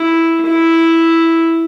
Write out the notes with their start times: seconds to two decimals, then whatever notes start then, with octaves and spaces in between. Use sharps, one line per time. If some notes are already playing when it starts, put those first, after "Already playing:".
Already playing: E4
0.45 E4